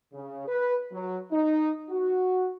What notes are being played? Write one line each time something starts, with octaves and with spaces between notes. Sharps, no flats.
C#3
B4
F#3
D#4
F#4